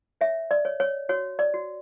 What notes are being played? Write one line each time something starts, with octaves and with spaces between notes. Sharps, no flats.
C#5 E5
D5
C#5
C#5
F#4 C#5
D5
F#4